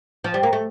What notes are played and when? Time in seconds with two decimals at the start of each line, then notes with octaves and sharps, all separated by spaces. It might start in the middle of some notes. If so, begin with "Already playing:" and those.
0.24 F3
0.34 G3
0.43 A#3
0.53 A3